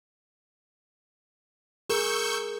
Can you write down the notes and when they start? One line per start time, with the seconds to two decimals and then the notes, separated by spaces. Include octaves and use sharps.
1.89 G#4 A#4 C#6 E6 G6